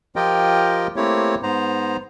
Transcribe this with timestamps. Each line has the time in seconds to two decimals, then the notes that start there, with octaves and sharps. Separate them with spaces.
0.16 F3 F4 G4 A#4 D#5 G5
0.96 A3 A#3 C4 E4 G4 C#5
1.43 G#2 B3 C5 A#5